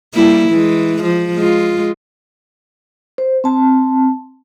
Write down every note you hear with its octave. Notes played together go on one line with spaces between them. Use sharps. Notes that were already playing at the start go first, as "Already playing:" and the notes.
G3 A#3 E4
E3 G#3
F3
G#3 F4
C5
C4 A5